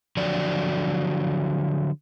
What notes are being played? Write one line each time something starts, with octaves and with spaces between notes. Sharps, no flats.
D3 F3 F#3 F#4 D5